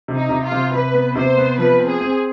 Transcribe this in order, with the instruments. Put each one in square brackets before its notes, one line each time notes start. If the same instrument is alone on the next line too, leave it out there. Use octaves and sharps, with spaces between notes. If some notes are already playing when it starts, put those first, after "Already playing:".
[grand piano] C3
[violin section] D#4
[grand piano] C3
[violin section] F4
[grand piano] C3
[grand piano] C3 [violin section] B4
[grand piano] B3
[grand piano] C3 [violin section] C5
[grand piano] B3
[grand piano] F3 [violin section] B4
[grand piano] C4
[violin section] G#4
[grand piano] C4